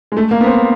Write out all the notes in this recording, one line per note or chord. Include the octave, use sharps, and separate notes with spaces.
G#3
A3
A#3
B3
C4